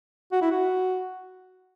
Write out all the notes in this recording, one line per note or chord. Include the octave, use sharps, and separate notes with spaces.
F#4
E4
F#4